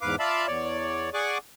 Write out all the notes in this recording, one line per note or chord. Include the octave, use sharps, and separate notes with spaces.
E2 G#2 B4 F5 D6
F4 D5 E5 F5 A5 B5
E2 C#5 D5
G#4 D5 F#5 G#5 C#6 D6